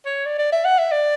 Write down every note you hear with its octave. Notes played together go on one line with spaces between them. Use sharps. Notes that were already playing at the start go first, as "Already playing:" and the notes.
C#5
D5
D5
E5
F#5
E5
D5